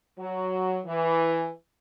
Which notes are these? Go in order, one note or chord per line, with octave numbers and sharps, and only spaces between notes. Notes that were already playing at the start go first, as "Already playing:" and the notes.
F#3
E3